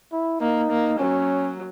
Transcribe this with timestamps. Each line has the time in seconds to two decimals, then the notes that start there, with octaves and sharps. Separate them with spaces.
0.12 E4
0.41 A#3 D#4
0.70 A#3
0.99 F#3 C#4